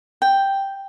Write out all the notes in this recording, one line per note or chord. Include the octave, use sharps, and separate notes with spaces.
G5